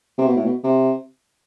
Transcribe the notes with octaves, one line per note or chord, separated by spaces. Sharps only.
C3
B2
A2
B2
C3